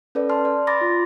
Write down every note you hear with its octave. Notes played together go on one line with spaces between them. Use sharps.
C#4 A4 B4 D5
A5 C6 F6
D5
B5 C6 D6 A6 A#6
F4